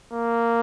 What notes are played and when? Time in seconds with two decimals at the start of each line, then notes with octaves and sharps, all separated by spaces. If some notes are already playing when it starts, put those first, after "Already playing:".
0.13 A#3